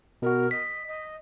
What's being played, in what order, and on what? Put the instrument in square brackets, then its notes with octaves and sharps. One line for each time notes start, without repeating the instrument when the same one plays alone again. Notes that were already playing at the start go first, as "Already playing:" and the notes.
[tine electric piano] B2 F#4 [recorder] A#4
[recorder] D#5 [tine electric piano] B6
[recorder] D#5